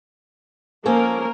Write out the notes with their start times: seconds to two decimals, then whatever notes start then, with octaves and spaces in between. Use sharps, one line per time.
0.85 F3 A#3 C#4 A4 A#4